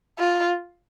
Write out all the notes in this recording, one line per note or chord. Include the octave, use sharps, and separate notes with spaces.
F4